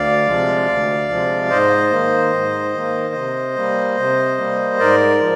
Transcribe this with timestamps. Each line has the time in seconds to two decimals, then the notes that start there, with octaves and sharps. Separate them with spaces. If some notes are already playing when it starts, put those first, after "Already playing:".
Already playing: D2 D5 F5
0.27 C3 F3 G#3
0.67 D2
1.09 C3 F3 G#3
1.50 G#2 C5 D#5
1.90 D#3 A#3
2.33 G#2
2.74 D#3 A#3
3.14 C3
3.56 G3 A#3
3.97 C3
4.38 G3 A#3
4.79 G#2 A#4 D5
5.20 F3